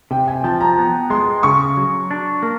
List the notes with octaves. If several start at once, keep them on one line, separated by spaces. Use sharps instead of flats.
C3 G5
G#5
F3 A5
A#5
B3
G#3 C6
C#3 C#6
F#3
D4
A#3